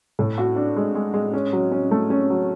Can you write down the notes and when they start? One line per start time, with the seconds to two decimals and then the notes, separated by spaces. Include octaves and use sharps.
0.19 A2
0.38 F#4
0.56 D4
0.77 G#3
0.95 G#3
1.14 G#3
1.33 C#4
1.53 F#3
1.72 C#4
1.91 A3
2.10 C#4
2.30 F#3